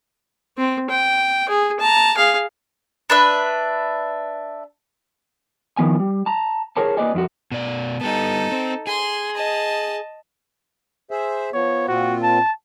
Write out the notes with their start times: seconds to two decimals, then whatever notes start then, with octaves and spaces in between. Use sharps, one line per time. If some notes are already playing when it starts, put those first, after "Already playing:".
0.58 C4
0.90 G5
1.49 G#4
1.80 A5 A#5
2.17 G#4 F5
3.10 D4 B4 E5
5.77 D#3 F3 B3 G#5
5.99 G3
6.26 A5 A#5
6.77 G#4 A#4 C5 C#5 A5
6.97 A#3 B4 D5 D#5 G#5
7.15 F2 E4 F#4
7.52 B2 D5
8.01 G3 B3 D#4 A4
8.52 C4
8.87 G#4 C6
9.35 D#5 A5
11.11 G#4 C5 E5
11.54 F3 B3 C#5
11.88 A#2 C4 F4 F#4
12.23 A5